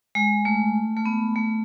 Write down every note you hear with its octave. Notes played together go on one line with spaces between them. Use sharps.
G#3
A3
A3
B3
A3